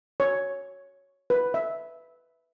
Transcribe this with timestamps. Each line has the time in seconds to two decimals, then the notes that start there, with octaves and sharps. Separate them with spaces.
0.20 C#5
1.30 B4
1.54 E5